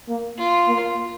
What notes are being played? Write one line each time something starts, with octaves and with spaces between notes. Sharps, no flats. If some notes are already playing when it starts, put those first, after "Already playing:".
A#3
F4
A#3